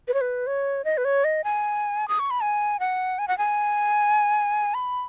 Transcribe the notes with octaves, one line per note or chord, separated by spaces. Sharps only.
B4
C#5
B4
C#5
D#5
B4
C#5
D#5
G#5
D#6
C#6
B5
G#5
F#5
G#5
F#5
G#5
B5